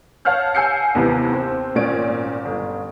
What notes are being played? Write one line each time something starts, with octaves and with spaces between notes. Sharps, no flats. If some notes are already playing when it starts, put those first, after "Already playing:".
C#5 F5 F#5 A5 F6 G6
F#5 G#5 E6 G6 C7 C#7
D#2 C3 E3 B3
C4
G#1 A#2 C#4 D5 D7
G1